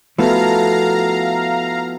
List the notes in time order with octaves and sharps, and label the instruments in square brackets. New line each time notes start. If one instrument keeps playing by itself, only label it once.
[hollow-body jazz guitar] F3 A3 B3 [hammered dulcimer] E4 F#4 A4 [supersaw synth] F5 A#5